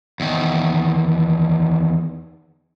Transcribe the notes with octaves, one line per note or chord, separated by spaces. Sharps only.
E2 D#3